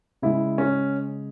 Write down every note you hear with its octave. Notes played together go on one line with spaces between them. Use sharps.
C#3 G#3 E4
C#4